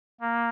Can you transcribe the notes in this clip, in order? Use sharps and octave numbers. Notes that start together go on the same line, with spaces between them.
A#3